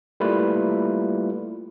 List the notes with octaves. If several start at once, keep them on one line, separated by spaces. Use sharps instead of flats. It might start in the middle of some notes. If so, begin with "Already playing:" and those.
G3 A3 A#3 E4 F4 B4